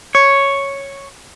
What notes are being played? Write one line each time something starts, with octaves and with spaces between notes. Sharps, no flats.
C#5